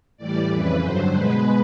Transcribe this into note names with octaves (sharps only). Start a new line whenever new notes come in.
A2 E3 G3 D5
F2 C#3 E3 B4
G2 D3 F#3 C5
B2 G#3 B4